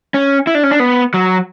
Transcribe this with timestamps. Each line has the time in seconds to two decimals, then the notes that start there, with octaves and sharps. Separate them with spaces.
0.14 C#4
0.47 E4
0.55 D4
0.64 C#4
0.71 D4
0.80 B3
1.14 F#3